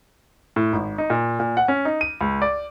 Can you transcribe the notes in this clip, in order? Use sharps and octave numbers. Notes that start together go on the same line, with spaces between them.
A2
G#1
D#4
A#2
A#2
F#5
C#4
D#4
D#7
C#2
D5